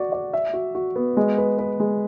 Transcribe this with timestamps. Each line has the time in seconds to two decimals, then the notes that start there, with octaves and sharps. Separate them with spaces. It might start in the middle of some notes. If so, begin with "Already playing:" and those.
Already playing: F#4 D5
0.12 D5
0.33 E5
0.53 F#4
0.75 F#4
0.96 B3
1.17 G#3
1.38 B4
1.59 B4
1.80 G#3